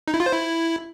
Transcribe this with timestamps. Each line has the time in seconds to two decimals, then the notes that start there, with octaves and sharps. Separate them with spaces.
0.08 D#4
0.14 E4
0.20 F4
0.26 C5
0.33 E4